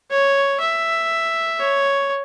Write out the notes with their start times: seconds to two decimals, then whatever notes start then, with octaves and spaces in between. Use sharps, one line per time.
0.10 C#5
0.60 E5
1.59 C#5